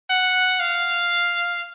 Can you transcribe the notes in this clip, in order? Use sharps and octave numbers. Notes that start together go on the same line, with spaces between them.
F#5
F5